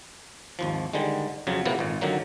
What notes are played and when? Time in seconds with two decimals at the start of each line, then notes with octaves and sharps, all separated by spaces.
0.59 G#1 D#2 F3
0.93 D3 D#3 G3 G#3
1.47 F2 C#3 F#3
1.65 A2 C3 E3 A#3 B3
1.79 G#1 A#2
2.01 F#2 D3 D#3 F#3 A#3